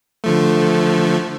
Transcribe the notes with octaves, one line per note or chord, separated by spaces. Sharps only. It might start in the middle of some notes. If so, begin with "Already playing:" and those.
D3 F3 A3